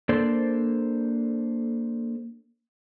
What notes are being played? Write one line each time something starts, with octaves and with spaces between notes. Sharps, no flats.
A#3 D4 A4 C5 D5